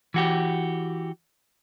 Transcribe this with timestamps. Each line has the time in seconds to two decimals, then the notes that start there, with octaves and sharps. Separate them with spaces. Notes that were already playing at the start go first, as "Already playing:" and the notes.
0.14 E3 F#4 G4